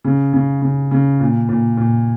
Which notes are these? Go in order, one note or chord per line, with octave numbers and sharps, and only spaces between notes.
C#3
C#3
C#3
C#3
A#2
A#2
A#2